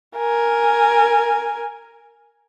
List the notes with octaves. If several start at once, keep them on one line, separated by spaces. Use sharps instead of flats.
A#4 G#5